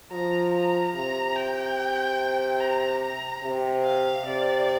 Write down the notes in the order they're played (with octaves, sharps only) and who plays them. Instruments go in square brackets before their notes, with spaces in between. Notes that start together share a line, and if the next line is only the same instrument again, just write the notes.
[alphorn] F3 [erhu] A#5
[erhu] A#5
[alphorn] C3 [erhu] A#5
[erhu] G5
A#5
A#5
[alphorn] C3
[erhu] F5
[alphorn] C3 [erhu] D5